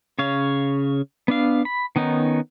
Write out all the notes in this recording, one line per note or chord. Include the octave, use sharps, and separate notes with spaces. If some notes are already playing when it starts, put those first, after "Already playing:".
C#3 C#5 F5
B3 D4 F5
B5
D#3 B3 C#4 D#4